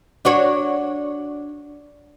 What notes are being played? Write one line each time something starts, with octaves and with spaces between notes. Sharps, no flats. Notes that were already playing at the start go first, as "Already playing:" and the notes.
D4 F#4 C#5